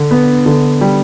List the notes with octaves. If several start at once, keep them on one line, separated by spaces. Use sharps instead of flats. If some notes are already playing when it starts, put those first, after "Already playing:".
Already playing: D3
B3
D3
G3